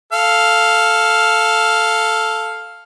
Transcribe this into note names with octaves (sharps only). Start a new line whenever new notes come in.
A4 F5